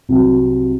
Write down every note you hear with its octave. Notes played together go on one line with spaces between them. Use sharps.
C2 C3 F#3